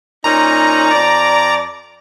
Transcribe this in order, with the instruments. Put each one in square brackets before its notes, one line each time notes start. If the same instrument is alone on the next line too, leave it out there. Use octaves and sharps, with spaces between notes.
[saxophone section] A#2 C#4 D#4 [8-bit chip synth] A#5
[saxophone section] F2 D5